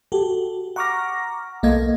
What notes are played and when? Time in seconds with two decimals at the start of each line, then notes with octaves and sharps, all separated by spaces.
0.12 F#4 G4 A4
0.76 F#5 A#5 C#6 D6 F6 A#6
1.63 B1 A#3 A4 D#5 F5 G#6